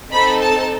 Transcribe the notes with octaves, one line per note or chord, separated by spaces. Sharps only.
C4 D#4 A4 B5
A5